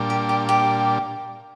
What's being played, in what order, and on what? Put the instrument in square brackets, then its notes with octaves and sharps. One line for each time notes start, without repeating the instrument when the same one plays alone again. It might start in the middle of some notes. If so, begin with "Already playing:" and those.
Already playing: [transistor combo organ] A#2 G3 D4
[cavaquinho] G4
G4
G4